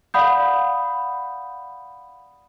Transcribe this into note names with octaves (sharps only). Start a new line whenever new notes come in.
D5 F5 F#5 B5 D#6 G6